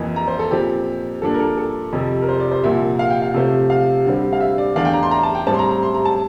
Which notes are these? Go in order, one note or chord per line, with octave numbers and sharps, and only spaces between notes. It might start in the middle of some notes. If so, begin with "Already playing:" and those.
Already playing: F2 E3 A#3
A#5
C5
A4
A#2 F3 C4 G4
G2 F3 A#3 D4 A4
A#4
A4
A4
F2 C3 F3
A#4
C5
D5
C5
C2 A#2 F3 E5
F5
G5
F5
C3 F3 A3 C4
F5
D2 D3 G3 C4
F5
E5
D5
E2 E3 A3 D4 F5
G5
A#5
C6
A#5
A5
G5
A2 G3 C4 A5
C6
A#5
A#5
C6
A#5
A5